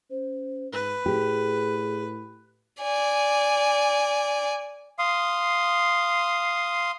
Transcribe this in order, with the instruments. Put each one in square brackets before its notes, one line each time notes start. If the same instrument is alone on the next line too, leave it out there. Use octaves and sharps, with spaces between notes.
[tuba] C#4 [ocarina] C5
[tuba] G#2 [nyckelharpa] B4
[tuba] A2 [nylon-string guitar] G4 [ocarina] G#4
[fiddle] D5 G#5
[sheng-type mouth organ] F5 C6 D#6